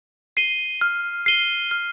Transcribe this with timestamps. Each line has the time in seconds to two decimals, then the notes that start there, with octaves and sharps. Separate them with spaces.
0.37 C7 D#7 G7
0.81 F6
1.26 C7 D#7 G7
1.71 F6